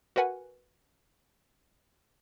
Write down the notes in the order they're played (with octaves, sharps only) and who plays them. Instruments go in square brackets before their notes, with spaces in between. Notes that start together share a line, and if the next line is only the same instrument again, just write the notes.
[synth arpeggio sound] F#4 A#4 B4 F#5 G#5